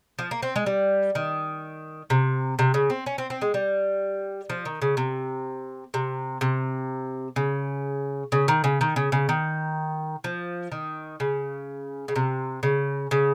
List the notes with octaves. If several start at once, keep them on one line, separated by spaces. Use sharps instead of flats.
F3
A#3
C4
G#3
G3
D#3
C3
C3
C#3
C4
C#4
C4
C4
G#3
G3
F3
D#3
C#3
C3
C3
C3
C#3
C#3
D#3
C#3
D#3
C#3
C#3
D#3
F3
D#3
C#3
C#3
C3
C#3
C#3